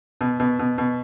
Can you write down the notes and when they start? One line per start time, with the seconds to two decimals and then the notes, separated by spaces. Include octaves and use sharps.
0.21 B2
0.40 B2
0.59 B2
0.78 B2